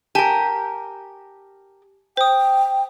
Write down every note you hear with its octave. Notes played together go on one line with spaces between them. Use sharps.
G4 A#4 G#5 A5
C5 G5 D#6